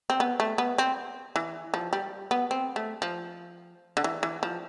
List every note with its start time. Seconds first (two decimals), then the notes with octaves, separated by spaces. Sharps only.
0.10 C4
0.20 B3
0.40 A3
0.58 B3
0.78 C4
1.36 E3
1.74 F3
1.93 G3
2.31 B3
2.51 C4
2.76 A3
3.02 F3
3.97 D3
4.04 E3
4.23 E3
4.43 F3